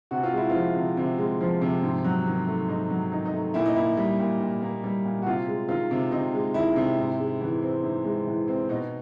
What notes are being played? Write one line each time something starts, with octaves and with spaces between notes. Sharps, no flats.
C3 F#4
F4
G#3 E4
F3 F4
C3
C3
G#3
F3
C3
G#2
F#3
D#3
A3
G#2 D#4
F#3
D#3 D#4
D#4
A3
A#2 E4
D#4
A#3 E4
G3
A#2
A#2
A#3
G3
A#2
F#4
C3 F4
G#3
D#3 F4
C3
C3 D#4
G#3
D#3 E4
C3
G#2
G#3
E3
C4
G#2
G#3
E3
C4
B2 D#4